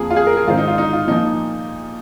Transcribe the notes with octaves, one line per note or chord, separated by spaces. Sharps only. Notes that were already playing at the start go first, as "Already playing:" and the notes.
Already playing: F2 F3 A#3 G#4
F4
G#4
A#4
G#4
G#2 D#3 C4 F4
D#4
F4
D#4
F4
A#2 F3 A#3 D#4